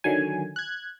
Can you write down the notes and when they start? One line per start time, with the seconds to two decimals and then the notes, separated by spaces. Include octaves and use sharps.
0.04 D3 D#3 F#3 G#5
0.56 F#6 G#6